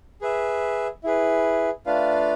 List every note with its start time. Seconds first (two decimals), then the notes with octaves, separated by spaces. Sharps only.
0.21 G#4 B4 E5
1.04 E4 G#4 B4
1.86 A3 D4 F4 B4 F5